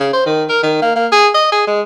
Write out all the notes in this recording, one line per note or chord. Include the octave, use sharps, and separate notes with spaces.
C#3
C5
D#3
A#4
D#3
A#3
A#3
G#4
D#5
G#4
G#3